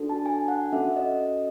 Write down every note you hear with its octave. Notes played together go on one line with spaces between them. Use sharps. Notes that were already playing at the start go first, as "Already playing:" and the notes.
Already playing: D4 F#4 A4
A5
G#5
F#5
C#4 F#4 A4 E5
D#5
D#5